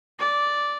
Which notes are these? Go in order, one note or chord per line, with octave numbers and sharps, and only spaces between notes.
D5